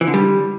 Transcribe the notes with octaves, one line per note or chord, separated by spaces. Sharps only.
E3
D3
G3